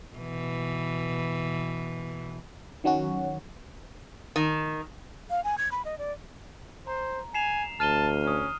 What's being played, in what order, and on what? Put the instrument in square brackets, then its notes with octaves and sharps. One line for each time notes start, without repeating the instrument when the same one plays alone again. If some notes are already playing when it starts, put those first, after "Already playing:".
[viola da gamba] B2 E3
[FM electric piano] D#3 F#3 C#4 F#4
[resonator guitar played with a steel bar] D#3
[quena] F5
G#5
G#6
B5
D#5
D5
[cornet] C5 [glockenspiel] A#5
[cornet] G#5 [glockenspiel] C7 E7 F7
[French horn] D2 [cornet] A5 [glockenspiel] F6 D#7 G7
[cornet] C#4 [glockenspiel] D#6 F6